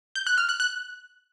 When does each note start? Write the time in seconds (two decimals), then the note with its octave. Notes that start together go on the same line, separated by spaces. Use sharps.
0.15 G6
0.27 F#6
0.38 F6
0.49 F#6
0.60 F#6